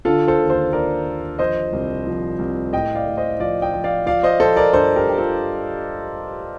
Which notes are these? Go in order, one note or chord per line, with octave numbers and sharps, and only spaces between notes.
D3 F4 A4
A4 C5
D#2
A4 C5
D3 A#4 D5
D#2
F3 C5 D#5
C2
F3
C2
A2 D#5 G5
D5 F5
A2
C5 D#5
F3 D5 F5
D#5 G5
F3
D5 F5
F3 D5 F5
C5 D#5
F3 A4 C5
A#4 D5
G2 A4 C5
G4 A#4
G2 G4
F4 A4